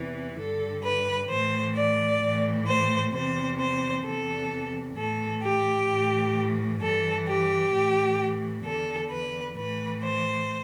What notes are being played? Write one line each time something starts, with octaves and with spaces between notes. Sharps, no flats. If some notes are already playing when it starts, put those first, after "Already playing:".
Already playing: E2 C3 E3
G2 D3 A4
B4
A2 E3 C5
D5
A2 E3
C5
E2 C3 E3 C5
C5
E2 C3 E3 A4
A2 E3 A4
G4
A2 E3
G2 E3 A4
G4
A2 E3
E2 D3 A4
B4
A2 E3 B4
C5